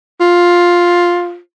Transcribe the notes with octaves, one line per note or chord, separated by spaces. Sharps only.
F4